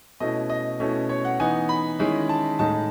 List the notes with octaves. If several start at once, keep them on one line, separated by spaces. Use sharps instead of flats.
B2 A3 C#4 E4 D#5
D#5
B2 A3 C#4 E4
C#5
F#5
E3 B3 D#4 G#5
B5
D#3 G#3 C#4 E4
A5
A2 G#3 D#4 A5